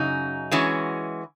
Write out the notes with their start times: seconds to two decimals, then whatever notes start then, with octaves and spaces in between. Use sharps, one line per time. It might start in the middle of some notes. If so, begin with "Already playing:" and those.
Already playing: F#2 C#3 D#4
0.51 E3 G#3 C#4 F#4